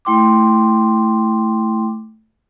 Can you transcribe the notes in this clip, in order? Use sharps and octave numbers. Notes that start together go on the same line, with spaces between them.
A3 E4 G5 C6 D6